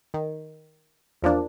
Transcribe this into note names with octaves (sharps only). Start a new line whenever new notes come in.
D#3
E2 F3 A#3 D4